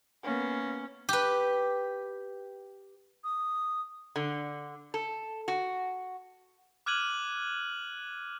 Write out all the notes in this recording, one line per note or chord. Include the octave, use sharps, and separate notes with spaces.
A#3 B3 C#4
G4 B4
D#6
D3
A4
F#4
D6 F6 F#6 G#6 D#7 F#7